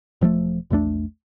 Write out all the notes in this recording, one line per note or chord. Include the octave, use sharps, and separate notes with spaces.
E1 F3 G#3 A3
A#1 E2 A3 D4